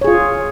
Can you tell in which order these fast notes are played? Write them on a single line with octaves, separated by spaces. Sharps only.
C#5 G#4 F4